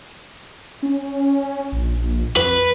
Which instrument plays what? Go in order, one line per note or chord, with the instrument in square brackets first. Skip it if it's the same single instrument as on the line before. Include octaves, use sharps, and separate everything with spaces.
[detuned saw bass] C#4
A#1
[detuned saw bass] F2 [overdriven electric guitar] B4